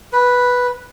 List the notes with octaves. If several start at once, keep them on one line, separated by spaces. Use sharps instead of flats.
B4